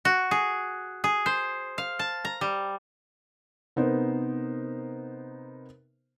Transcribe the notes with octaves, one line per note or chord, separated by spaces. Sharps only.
F#4
G#4
G#4
C5
F5
A5
A#5
G3
C3 B3 D#4 A#4 C5